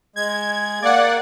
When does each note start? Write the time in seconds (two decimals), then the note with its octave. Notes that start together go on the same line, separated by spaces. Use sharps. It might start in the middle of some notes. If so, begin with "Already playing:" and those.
0.16 G#3 G#6
0.82 A#3 D5 F#5